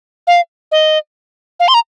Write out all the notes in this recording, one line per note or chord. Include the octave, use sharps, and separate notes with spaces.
F5
D#5
F5
C6
A#5